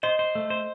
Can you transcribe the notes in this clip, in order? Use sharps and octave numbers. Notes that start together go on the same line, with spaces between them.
C5 D#5
C5
A3
C5